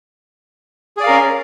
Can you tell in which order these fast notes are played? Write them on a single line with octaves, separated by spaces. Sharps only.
G#4 D5 F5 A#4 C#4